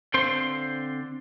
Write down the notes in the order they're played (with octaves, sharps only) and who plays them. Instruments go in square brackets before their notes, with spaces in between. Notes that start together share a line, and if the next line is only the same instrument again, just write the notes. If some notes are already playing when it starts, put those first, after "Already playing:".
[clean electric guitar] D3 C4 C5 F5 C6